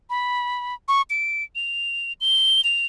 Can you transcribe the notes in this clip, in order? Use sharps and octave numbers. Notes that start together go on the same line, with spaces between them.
B5
C#6
D7
F7
G7
F7